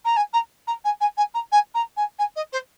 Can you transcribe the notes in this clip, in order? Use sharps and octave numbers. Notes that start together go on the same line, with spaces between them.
A#5
G#5
A#5
A#5
G#5
G#5
G#5
A#5
G#5
A#5
G#5
G#5
D#5
C5